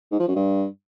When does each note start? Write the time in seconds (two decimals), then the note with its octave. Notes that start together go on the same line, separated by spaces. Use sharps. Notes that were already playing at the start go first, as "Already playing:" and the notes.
0.12 G#2
0.20 F3
0.28 F#2
0.35 G2